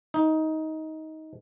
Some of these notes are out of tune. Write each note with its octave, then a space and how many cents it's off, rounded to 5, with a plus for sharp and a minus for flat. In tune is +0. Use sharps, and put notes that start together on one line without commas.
D#4 +15